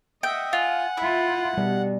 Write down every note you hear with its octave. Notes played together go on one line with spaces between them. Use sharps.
D#5 E5 F#5 G5
F4 F#5 G#5
E4 F4 B5
B2 G3